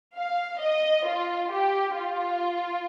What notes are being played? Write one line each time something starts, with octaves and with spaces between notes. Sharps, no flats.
F5
D#5
F4
G4
F4